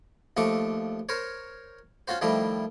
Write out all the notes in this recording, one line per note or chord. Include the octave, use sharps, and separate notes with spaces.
D#2 F3 A3 C#6 D6
A#4 C5 C#5
C#4 F4 F#4 C5
D#3 F3 G3 A3 E4